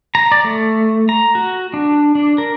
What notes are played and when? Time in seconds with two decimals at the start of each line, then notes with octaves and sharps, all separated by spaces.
0.15 A#5
0.32 D5
0.44 A3
1.09 A#5
1.35 F#4
1.74 D4
2.15 D4
2.38 A#4